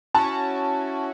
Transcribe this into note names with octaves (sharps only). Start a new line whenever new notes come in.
C#4 E4 F#4 A5